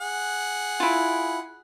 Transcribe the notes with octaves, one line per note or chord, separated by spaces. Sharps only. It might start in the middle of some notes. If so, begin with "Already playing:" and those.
G#4 F#5
E4 F4